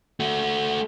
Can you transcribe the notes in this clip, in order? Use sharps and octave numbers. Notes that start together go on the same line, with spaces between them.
A3 F#4